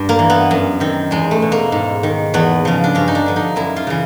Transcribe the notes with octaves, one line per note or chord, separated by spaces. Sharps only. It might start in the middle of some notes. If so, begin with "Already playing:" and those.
Already playing: G2
A#3
E3
B3
F#2
D#3 C4
E2 G#3
A3
B2
A#3
G#2
D#3
E2 B3
C#3 F3
D4
G2 C#4
D#4
D4
D3 F3
D#4
F#2 E4
F4
C#3 E3